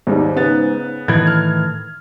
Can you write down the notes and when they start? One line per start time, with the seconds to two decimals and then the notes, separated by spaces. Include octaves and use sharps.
0.07 D#2 G#2 G3
0.36 C#3 B3 A6
1.08 A2 D#3 E3 G#6
1.27 F6